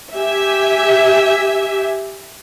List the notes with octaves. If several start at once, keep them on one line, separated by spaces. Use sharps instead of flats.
G4 E5 G#5